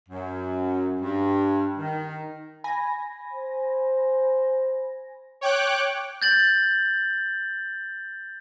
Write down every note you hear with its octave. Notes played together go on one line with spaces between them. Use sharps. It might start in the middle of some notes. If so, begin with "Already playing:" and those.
F#2
G2
D#3
G#5 B5 A#6
C5
C#5 G5 D6 F#6
G6 A6 F#7